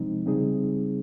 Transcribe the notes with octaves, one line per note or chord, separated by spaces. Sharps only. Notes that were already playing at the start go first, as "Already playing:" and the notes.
Already playing: C3 F3 G#3 C4 D#4
C#3 G3 C4 D#4 G#4